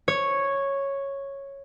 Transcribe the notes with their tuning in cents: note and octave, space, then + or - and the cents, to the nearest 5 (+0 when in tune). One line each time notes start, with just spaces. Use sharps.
C#5 -5